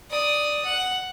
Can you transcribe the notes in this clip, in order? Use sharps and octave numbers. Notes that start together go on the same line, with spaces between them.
D5 D#6
F#5